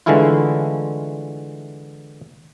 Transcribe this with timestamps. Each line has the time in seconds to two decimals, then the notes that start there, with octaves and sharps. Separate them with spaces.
0.06 D3 E3 G#3 A3 E4 F4